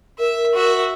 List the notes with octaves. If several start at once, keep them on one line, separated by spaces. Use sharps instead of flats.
A#4 E5
F#4 E5